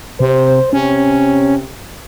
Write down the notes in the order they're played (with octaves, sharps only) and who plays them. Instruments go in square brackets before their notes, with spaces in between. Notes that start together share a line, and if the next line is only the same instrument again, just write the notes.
[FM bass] C3 [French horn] C5
[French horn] C3 [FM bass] C#4